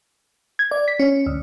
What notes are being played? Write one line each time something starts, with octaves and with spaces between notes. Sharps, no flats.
G#6
D5
B6
C#4
D2